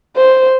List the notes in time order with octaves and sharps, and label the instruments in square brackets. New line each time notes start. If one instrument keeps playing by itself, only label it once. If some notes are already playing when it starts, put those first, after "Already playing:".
[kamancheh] C5